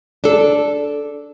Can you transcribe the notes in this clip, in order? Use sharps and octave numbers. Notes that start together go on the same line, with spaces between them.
D4 A4